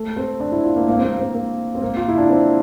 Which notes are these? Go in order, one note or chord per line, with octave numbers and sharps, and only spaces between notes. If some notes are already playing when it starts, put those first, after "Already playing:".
Already playing: A3
C4
D4
E4
F4
A#3
A#3
C4
A#3
C4
A#3
C4
A#3
F4
E4
D4
C4